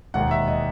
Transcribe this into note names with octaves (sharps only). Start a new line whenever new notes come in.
E1 D#2 D#3 F#5
E5
D#5